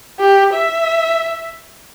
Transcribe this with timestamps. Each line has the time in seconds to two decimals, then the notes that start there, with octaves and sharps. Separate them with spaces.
0.20 G4
0.54 E5